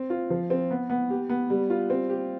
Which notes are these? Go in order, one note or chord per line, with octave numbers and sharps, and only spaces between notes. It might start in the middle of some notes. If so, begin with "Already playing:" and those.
Already playing: C4
F4
F3
C4
B3
B3
G4
B3
G3
F4
C4
G4